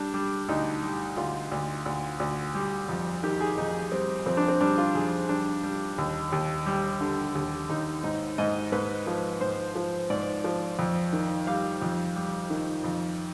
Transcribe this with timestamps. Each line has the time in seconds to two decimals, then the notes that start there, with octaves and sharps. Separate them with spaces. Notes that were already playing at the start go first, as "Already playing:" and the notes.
Already playing: G3 D4
0.14 G3
0.49 D2 D#4
0.83 G3
1.17 D2 F4
1.52 D2
1.86 D2
2.20 D2
2.55 G3
2.89 F2
3.23 D#3 G4
3.40 G#4
3.58 F2 D#4
3.92 G3 C4
4.26 F2 C4
4.37 D4
4.48 C4
4.61 G3 D4
4.78 F4
4.95 F2 G#4
5.29 G3 D4
5.64 G3
5.98 D#2
6.32 D#2
6.66 G3
7.01 D3
7.35 D#2
7.69 D#2 D#4
8.04 G#2 D#4
8.38 G#2 D#5
8.72 G#2 B4
9.07 F3
9.41 G#2 C5
9.75 F3
10.10 G#2 D5
10.44 F3
10.79 F2
11.13 D#3
11.47 G3 F5
11.82 F2
12.16 G3
12.50 D#3
12.84 F2